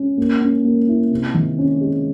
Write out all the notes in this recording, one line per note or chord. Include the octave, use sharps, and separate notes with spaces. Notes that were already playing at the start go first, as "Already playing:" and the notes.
Already playing: C#4
A#3
C#4
A#3
E4
C3
D#3
C#4
G#3